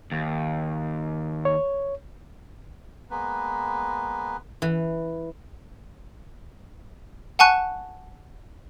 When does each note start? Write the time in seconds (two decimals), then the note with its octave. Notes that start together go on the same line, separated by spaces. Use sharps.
0.11 D#2
1.45 C#5
3.11 G#3 A#3 B3 B4
4.62 E3
7.39 F#5 G#5 A5 C#6 F#6